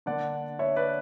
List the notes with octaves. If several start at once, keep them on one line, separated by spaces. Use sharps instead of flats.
D3 A#3 D4 D5 F#5
C#5 E5
B4 D5